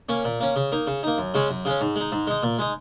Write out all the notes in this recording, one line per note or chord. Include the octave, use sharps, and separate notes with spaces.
A#3 C#4
A#2
A#3 C#4
C#3
A#3 D#4
C#3
A#3 D#4
F#2
C#3 G#3 C#4
F#2
C#3 G#3 C#4
G#2
G#3 D#4
G#2
G#3 D#4
A#2
G#3 D#4